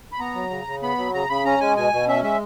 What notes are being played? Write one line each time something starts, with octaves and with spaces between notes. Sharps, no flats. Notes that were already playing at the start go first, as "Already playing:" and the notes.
B5
B3 A#5
F#3
C#3
C#3
B3 B5
F#3
C#3 A#5
C#3 B5
C#4 A#5
G#3 G#5
B2 G#5
B2
C#4 E5
G#3 E5